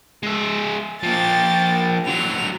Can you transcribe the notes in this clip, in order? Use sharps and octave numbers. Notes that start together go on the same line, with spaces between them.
G#3 E5
F3 A#3 G5 A6
D3 F#3 F7